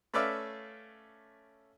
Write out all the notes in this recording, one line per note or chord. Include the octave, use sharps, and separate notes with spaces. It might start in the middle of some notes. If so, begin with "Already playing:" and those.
A3 C#4 B4 D5 E5 F5